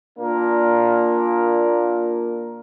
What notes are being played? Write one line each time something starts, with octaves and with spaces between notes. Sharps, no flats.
A#2 A#3 D4 A#4